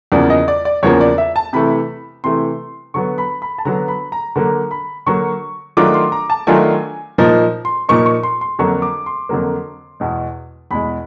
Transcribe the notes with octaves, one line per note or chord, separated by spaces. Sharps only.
E2 C#3 F3 A#3 D5
D#5
D5
D5
E2 C#3 F3 A#3 C#5
D5
E5
A5
C3 E3 A3 B5
C3 E3 A3 C6
D3 F#3 B3 C#6
B5
B5
A5
D3 F#3 B3 A#5
B5
A#5
D3 F#3 A#3 A#5
B5
D3 F#3 A#3 C#6
D#3 F#3 A3 D4 F4 D6
C6
A#5
A5
D#3 F#3 A3 D4 F4 G#5
A#2 F3 A#3 D#4 A#5
C6
A#2 F3 A#3 D#4 C#6
C#6
C6
C6
F2 D3 F#3 A#3 C#6
D6
C6
F2 D3 F#3 A#3
E2 B2 G#3
E2 B2 G#3 B5